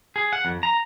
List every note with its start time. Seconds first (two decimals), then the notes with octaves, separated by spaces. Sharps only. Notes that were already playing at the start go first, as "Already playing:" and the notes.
0.16 G#4
0.33 F#5
0.45 F2
0.63 A#5